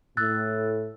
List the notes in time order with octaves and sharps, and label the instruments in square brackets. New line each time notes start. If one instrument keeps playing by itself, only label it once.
[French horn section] A2 [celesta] E6 F#6 A6